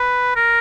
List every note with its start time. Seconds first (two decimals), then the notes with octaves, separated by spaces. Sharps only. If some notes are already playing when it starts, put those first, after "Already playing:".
Already playing: B4
0.36 A#4